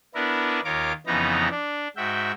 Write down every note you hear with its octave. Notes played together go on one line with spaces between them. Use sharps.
B3 D4 E4 A#4 B4
D#2 F4 A#4 C#5 D6
F2 C#3 E3 B3 D#4 A#5
D4
G#2 F#4 E5 G5